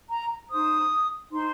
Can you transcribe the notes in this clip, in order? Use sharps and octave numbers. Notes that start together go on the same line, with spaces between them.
A#5
D#4 C5 D#6
D#4 C5 C6